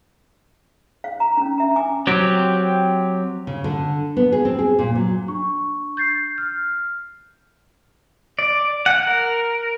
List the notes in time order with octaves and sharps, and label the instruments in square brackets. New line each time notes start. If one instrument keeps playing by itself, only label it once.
[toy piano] F5
A#5
C#4 D4
E5 A#5
G#5 D6
[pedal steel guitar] F#3 C4 G4
[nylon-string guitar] C#3
D3
B3
G#4
C4
G#4
A#2
F#3
[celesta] D4 C#6
G6 A6 C7
F6
[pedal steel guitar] D5
F#5
A#4